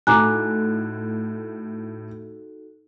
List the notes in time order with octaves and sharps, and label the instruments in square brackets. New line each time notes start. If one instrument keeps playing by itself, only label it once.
[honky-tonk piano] A2 [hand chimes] D#4 F#4 A4 [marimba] G#5 A#5 D6 [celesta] F#6